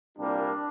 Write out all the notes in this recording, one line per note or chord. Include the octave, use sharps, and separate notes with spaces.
C2 A#2 G3 A#3 D4